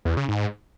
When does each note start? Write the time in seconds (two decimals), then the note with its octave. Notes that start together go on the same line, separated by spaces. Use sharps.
0.05 E2
0.17 C#3
0.28 G#2